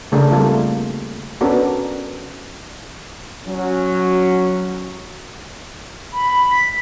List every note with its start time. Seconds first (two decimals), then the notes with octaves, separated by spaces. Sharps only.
0.12 C#3 A3 D4 G#4 A#4
0.31 G3 A3 A#3 C4 F4 A4
1.41 B3 C#4 D4 F#4 A4 A#4
3.47 F#3 C#4
6.13 B5
6.52 B6